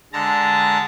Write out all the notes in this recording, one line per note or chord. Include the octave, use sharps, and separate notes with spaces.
D3 G#3 A5 A#5